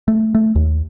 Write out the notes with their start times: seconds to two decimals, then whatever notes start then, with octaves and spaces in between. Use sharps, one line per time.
0.08 A3
0.35 A3
0.55 D#2